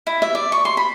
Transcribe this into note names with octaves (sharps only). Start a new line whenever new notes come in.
E4
E5
D5
C#6
C6
B5